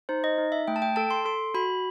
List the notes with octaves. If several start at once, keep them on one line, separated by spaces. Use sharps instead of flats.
D#4 C5
D#5
D#4
E5
A3 G5
A5
G5
A4 A5
C6
A4 C6
F#4 B5